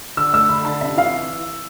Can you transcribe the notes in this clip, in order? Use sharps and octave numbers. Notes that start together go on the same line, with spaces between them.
D3 E6
A3 E6
D3 B5
D3 A5
C3 E5
E3 F5